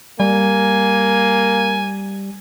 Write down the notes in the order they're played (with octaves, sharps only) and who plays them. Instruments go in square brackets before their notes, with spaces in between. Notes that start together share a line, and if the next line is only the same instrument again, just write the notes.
[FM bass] G3 [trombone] A#3 [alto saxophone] G#5